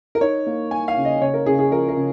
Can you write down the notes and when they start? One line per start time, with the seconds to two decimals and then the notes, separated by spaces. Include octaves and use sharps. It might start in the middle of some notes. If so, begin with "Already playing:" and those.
0.15 A#4
0.21 D#4 C#5
0.47 A#3
0.71 A#3 G#5
0.88 F5
0.97 C#3
1.05 D#5
1.21 C#3 C#5
1.34 A#4
1.46 C#3 G#4
1.59 G#4
1.71 F3 A#4
1.89 A#4
1.97 C#3